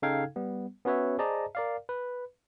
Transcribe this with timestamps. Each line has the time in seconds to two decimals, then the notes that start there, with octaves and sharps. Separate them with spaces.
0.02 C#3 D#4 A4 F5 G5 G#6
0.36 G3 B3
0.85 B3 C#4 F#4 B4 C#5 E5
1.19 G#4 C5 D5 D#5 A5 A#5
1.55 A#4 D5 F5
1.89 B4